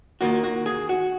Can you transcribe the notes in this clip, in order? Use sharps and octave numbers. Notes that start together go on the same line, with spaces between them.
D#2 D#3 A#3 F4 F#4
F#4
G#4
F#4